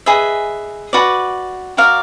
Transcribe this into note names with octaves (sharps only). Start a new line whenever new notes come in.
G#4 B4 D#5 E5
F#4 B4 D5
F#4 A#4 D5 F5